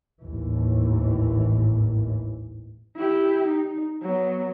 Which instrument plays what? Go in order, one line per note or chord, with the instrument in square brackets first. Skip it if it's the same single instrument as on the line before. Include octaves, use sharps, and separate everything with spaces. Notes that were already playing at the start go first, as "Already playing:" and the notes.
[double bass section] A1 D#2 G#2 E3
[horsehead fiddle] E4 G4
D#4
F#3 B3